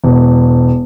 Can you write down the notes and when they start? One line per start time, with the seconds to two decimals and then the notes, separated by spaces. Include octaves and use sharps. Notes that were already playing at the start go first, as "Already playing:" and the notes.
0.04 E1